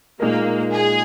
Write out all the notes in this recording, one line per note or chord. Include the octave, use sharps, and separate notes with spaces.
A#2 G#3 A#3 D#4 A#4
G#4